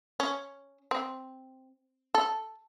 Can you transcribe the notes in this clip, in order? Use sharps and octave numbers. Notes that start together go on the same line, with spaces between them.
C#4
C4
A4